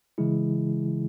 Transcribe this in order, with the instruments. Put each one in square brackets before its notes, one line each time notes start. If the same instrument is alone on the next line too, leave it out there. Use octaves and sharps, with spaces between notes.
[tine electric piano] C#3 E3 G#3 E4 G#4